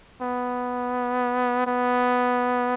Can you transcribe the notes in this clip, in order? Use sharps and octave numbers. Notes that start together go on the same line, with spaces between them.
B3
B3